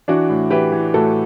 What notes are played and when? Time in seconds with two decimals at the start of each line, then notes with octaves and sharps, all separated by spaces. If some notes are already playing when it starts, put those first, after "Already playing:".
0.08 E3 D4 F#4
0.29 A2
0.51 E3 G4 B4
0.72 E3
0.94 A2 F#4 A4